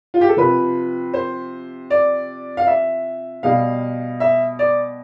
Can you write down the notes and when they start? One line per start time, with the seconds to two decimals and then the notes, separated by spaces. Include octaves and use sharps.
0.14 F4
0.21 G4
0.29 A4
0.37 C3 F3 B4
1.14 C5
1.90 D5
2.57 F5
2.67 E5
3.43 B2 G3 F5
4.20 E5
4.59 D5